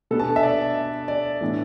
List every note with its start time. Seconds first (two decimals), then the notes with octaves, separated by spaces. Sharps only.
0.11 B2 B3 D4 A4
0.20 A5
0.36 E5
0.43 D5
1.08 D5
1.41 A2 E3 B3 D4